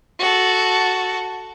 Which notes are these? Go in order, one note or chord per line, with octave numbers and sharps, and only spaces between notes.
F#4 A4